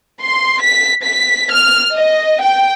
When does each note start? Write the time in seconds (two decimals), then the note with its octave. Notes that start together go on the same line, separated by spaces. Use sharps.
0.23 C6
0.63 B6
1.05 B6
1.51 F6
1.96 D#5
2.42 G5